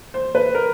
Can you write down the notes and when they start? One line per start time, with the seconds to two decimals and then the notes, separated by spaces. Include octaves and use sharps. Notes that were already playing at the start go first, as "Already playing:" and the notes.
0.14 C5
0.35 B4
0.55 A#4